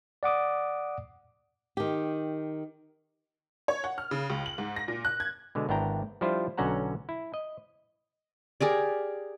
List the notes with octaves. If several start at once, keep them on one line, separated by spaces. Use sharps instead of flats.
D5 F#5 D6 D#6
D#3 G4
C#5
F#5
F6
C#3
C#2
F#7
G#2
A#6
A#2
F#6
G#6
B2 D3 G#3
G#1 B3 D4 E4 G5 A#5
F3 G3 D4 E4 F4 C5
B1 D3 C#4 F#4 F#5 A#5
E4
D#5
G4 G#4 A#4 D5